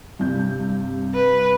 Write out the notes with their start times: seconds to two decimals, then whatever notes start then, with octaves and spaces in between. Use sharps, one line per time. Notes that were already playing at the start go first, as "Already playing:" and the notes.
0.19 G2 C3 G6
1.14 B4